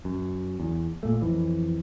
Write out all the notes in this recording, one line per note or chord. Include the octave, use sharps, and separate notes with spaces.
F#2
E2
A#2 A3
F2 E3